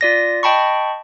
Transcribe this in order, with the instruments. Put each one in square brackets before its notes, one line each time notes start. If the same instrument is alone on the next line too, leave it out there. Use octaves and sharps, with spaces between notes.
[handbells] F4 D5 A#6
D#5 G5 A5 B5 C#6